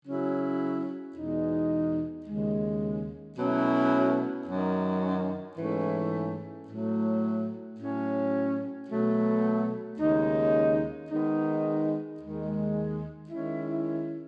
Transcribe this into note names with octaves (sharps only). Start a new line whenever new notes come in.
C#3 F#3 C#4 E4
E2 B2 G#3 D#4
D#2 C#3 G#3
B2 F#3 A3 C#4 E4
F#2 D#3 F#3
G#2 E3 A3 C#4 E4
A2 F#3 A3
A2 F#3 C#4
B2 F#3 A3
D#2 C#3 G#3 D#4
D#3 G#3 B3 D#4
D#2 D#3 G#3
D#3 G#3 C#4 E4